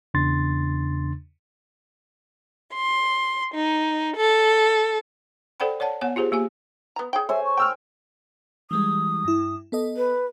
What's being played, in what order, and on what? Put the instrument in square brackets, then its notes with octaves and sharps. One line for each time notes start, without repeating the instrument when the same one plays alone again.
[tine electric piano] E2 C#3 D4 C6 A6
[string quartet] C6
D#4
A4
[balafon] A4 C5 D5 F#5 G5 B5
C#5 D5 F#5 A5
B3 C#5 F#5 G#5
F4 G4 G#4 C5
A#3 G4 G#5
[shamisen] B3 A#5
G#4 C#5 G5
[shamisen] A4 [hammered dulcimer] C5 C#5 G#5 [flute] E5
[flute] C#6
[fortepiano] G5 E6 F6
[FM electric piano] E3 G3 G#3 [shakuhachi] D#6
[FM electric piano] G2 E4
B3 A4 D#5
[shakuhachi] B4